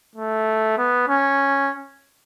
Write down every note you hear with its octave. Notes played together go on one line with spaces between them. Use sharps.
A3
B3
C#4